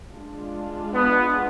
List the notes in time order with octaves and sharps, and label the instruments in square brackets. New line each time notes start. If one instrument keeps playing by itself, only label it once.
[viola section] G#3 D4 F4
[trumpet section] B3